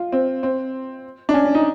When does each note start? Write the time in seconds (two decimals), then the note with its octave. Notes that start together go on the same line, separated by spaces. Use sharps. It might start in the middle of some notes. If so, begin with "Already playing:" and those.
Already playing: F4
0.12 C4
0.43 C4
1.29 D4
1.34 C#4
1.45 C#4
1.55 D#4